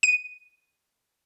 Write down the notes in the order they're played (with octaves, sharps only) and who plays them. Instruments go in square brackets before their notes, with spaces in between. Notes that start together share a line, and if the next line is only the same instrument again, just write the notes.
[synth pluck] D#7